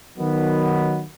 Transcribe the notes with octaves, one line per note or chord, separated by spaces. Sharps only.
D#3 F#3 B3